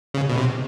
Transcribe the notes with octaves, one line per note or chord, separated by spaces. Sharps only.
C#3
B2
C3